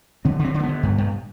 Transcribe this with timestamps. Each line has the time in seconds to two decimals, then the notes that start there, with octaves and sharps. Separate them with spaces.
0.25 D3 C4
0.39 D3
0.44 C4
0.54 D3
0.59 A3
0.63 B3
0.68 D3
0.83 G2
0.98 G2